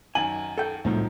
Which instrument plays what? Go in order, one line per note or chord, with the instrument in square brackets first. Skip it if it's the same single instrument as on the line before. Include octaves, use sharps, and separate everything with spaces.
[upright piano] F#2 D#3 F#7 [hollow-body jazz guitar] G#5
[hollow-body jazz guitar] A4 G5
[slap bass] C2 A2 A3 [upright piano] D#3 F3 F#3